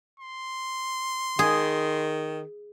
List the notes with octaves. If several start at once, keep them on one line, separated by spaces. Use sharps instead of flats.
C6
D#3 G#4